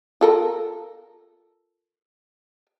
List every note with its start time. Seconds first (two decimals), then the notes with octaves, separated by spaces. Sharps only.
0.21 F4 A4 A#4